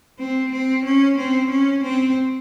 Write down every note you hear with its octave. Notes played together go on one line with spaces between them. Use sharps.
C4
C4
C#4
C4
C#4
C4